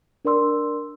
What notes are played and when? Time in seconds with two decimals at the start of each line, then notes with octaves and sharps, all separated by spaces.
0.25 D4 A#4 D5 C6 E6